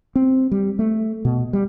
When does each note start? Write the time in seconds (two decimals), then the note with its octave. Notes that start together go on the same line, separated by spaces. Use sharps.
0.15 C4
0.51 G3
0.79 A3
1.25 B2
1.53 G3